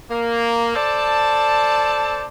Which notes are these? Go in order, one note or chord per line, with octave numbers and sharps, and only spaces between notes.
A#3
A4 C5 D5 A5